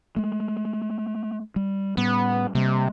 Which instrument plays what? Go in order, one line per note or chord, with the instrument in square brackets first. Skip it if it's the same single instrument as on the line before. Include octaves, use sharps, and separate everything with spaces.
[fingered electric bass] G#3 A3
G3
[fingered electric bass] A2 G3 [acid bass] B3
[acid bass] C3 [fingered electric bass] G3 A#3